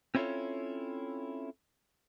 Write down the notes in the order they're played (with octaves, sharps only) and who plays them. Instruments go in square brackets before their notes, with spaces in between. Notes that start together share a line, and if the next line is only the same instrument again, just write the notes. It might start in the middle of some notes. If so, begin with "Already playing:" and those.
[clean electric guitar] C4 C#4 E4 F4 A4 C#5